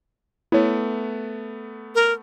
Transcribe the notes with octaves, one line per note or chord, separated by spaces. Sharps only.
A3 B3 E4 C#5
A#4